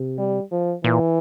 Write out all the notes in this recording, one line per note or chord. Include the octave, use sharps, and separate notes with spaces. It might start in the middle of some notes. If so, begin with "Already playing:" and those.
Already playing: C3
G3
F3
A#2 E3